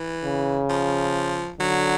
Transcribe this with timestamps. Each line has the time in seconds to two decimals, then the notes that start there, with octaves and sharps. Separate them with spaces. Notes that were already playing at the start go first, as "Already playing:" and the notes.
Already playing: E3
0.24 C#3
0.70 F3
1.60 D3 F#3